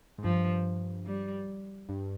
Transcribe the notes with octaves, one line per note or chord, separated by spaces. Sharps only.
G#2
G2 F3
G3
G2